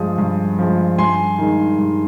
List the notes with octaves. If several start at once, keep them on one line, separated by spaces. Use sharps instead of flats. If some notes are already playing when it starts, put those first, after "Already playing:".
Already playing: G2 F3 G#3 D#6
G2
F3 G#3
G2 G#5 C6
D#3 G#3
G2